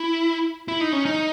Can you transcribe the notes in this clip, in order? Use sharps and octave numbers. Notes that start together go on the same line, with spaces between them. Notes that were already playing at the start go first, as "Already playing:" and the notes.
Already playing: E4
E4
D#4
C#4
D#4